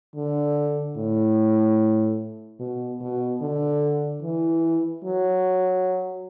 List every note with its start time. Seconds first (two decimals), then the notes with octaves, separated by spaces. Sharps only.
0.16 D3
0.97 A2
2.59 B2
3.01 B2
3.41 D3
4.23 E3
5.05 F#3